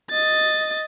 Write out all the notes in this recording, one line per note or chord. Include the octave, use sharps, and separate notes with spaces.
D#5 A6